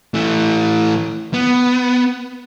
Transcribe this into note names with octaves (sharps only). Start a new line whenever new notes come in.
E3 A3
B3